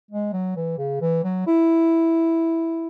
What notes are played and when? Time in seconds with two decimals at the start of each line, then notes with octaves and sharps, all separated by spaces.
0.11 G#3
0.33 F#3
0.56 E3
0.78 C#3
1.01 E3
1.24 F#3
1.47 E4